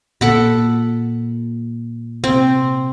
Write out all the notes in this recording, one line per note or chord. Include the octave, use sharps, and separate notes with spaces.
A#2 A4 F#5 B5
C3 C4